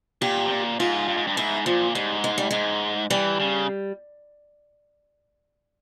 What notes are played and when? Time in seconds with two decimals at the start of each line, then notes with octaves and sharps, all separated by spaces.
0.22 A#2 G4
0.46 C3
0.50 A#2
0.80 G#2 F4
1.08 G2
1.17 G#2
1.27 G2
1.37 G#2 E4
1.66 A#2 F3
1.95 G#2 G3
2.24 G#3
2.38 G3
2.51 G#2 G#3
3.10 E3 G3
3.40 C#3